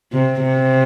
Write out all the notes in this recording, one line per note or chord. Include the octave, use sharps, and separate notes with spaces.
C3
C3